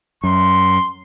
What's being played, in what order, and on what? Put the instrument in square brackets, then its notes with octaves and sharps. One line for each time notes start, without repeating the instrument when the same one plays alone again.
[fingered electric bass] F#2 [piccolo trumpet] C6